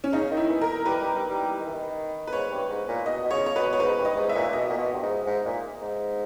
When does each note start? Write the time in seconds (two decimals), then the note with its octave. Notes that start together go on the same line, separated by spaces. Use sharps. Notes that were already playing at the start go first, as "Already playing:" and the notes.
0.04 C#4
0.12 C#3 D#4
0.31 D#3
0.37 E4
0.49 E3
0.61 A#4
0.85 G3 B4
1.01 G3
1.15 G3
1.30 G3
1.60 D#3
1.67 E3
1.73 D#3
2.27 B4
2.33 G#2 C#5
2.51 G2
2.69 G#2
2.88 A#2
3.06 B2 D#5
3.24 B2
3.31 C#3 C#5
3.46 C#5
3.55 B2 B4
3.73 C#5
3.80 G#2 B4
3.98 G2
4.05 D#5
4.16 G#2
4.29 E5
4.35 A#2
4.48 A#2
4.53 B2 D#5
4.70 A#2
4.78 B2
4.94 G2
5.02 G#2
5.26 G#2
5.45 A#2
5.82 G#2